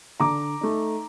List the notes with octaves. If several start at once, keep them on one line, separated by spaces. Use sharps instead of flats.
D3 A#5 D6
A3 D#4